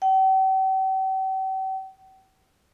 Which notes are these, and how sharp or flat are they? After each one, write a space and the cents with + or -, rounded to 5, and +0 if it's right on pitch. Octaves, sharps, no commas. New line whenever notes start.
G5 -45